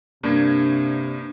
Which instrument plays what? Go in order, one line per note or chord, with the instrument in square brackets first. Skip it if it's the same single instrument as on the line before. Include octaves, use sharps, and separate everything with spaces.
[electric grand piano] G2 A#3 G#6 [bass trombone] C3 [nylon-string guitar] D4